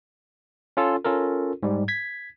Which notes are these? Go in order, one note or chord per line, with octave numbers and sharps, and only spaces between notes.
C#4 F4 A4
C#4 F4 A4 A#4
G#2 G3
G#6 B6